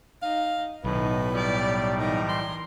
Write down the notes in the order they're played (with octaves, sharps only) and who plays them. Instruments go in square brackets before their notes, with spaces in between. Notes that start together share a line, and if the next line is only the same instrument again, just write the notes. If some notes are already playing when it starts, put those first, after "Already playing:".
[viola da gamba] D#4 [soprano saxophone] F5
[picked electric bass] B1 [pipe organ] A2 [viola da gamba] D#3 D#4 [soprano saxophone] B4
[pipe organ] A2 G3 [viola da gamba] G4 D5
[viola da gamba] E3 A#4 [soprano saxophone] D#4
[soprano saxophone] C6